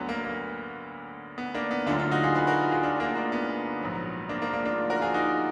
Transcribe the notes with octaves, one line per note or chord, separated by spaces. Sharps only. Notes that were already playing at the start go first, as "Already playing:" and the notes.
Already playing: D2 D3 F#3 B3
A#3
A#3
B3
A#3 D4
B3
D2 D3 F#3 D4 F4
D4 F4
D#4 F#4
F4 G#4
G#4 B4
F#4 A#4
F4 G#4
D4 F4
A#3 D4
A#3 D4
B3
A#1 G#2 F#3
A#3 D4
A#3 D4
A#3 D4
D4 F4
F#4 A#4
F4 G#4
D#4 F#4